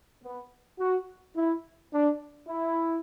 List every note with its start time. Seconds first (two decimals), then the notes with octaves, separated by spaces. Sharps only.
0.24 B3
0.79 F#4
1.36 E4
1.93 D4
2.48 E4